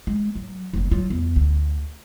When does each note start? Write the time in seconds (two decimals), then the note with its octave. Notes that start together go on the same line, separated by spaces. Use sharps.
0.07 G#3
0.35 F#3
0.73 F#1 C#2
0.91 F#3 F4
1.10 E2
1.36 D2